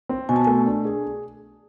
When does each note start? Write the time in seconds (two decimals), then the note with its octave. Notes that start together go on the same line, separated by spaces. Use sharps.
0.09 C4
0.29 B2 G#5
0.36 A5
0.45 A3 G#5
0.66 D4
0.85 G#4